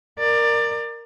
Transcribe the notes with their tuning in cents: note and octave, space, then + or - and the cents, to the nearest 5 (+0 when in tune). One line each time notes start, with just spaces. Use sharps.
A#4 +0 D5 +20